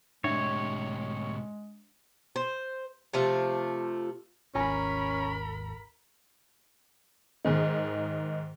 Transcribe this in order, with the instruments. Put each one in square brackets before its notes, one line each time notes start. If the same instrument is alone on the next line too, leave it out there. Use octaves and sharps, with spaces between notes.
[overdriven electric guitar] A2 C3 [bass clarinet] G#3 [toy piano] D4 D5 E5 [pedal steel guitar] C#5
[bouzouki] C5
C3 F3 A3 F4
[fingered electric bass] G#1 D#2 [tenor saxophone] C#4 [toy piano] F4 G#5 A#5 [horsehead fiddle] A#4 B5
[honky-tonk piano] G#2 D#3 D#4